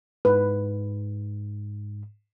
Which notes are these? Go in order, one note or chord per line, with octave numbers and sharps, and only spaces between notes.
G#2 B4